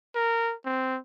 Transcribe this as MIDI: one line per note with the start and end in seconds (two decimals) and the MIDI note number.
0.15 0.54 70
0.65 0.98 60